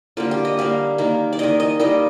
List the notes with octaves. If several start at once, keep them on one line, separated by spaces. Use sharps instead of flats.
D3 G3 A#3 F4
G4
D#5
D3 G3 A#3 F5
D#3 A#3
D5
D#3 A#3 D#5
D#5
D#3 G3 A#3 D#5